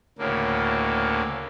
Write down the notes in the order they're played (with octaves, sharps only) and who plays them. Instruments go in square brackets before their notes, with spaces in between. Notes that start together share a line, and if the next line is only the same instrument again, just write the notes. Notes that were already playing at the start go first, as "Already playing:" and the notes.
[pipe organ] D2 A2 C#3 A#3